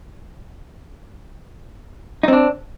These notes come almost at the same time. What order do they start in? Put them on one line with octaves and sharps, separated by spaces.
D#4 C4 D4